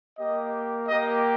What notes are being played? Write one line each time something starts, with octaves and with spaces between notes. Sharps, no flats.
A#3 G4 D#5
A#3 G4 D#5